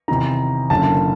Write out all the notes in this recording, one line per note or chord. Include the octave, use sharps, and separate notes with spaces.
E2 C3 D#3 A#5
F#1 F#2 D3 A5